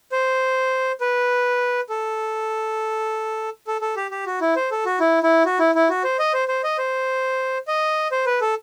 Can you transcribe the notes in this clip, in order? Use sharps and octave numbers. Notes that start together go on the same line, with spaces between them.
C5
B4
A4
A4
A4
G4
G4
F#4
E4
C5
A4
F#4
E4
E4
F#4
E4
E4
F#4
C5
D#5
C5
C5
D#5
C5
D#5
C5
B4
A4